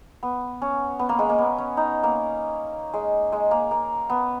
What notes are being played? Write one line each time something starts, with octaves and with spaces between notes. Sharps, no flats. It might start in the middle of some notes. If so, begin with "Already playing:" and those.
B3
C#4
B3
A#3
G#3
A#3
B3
C#4
D#4
A#3
G#3
G#3
A#3
A#3
B3